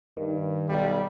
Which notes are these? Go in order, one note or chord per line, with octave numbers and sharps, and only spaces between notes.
G2 D#3
B1 G3